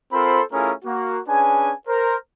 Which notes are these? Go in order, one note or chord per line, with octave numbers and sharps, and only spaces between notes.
C4 F4 A4 A#4 C5 B5
A3 C#4 E4 F4 G#4 A#4
A#3 F#4
C#4 D4 G#4 B4 G#5
A#4 C5